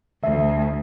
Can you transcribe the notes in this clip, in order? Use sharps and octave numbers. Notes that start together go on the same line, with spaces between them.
D2 E5